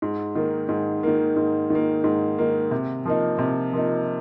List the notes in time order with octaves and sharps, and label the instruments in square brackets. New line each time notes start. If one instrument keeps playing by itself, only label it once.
[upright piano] G#2
D#3 A#3
G#2
D#3 A#3
G#2
D#3 A#3
G#2
D#3 A#3
C3
F3 A#3 D#4
C3
F3 A#3 D#4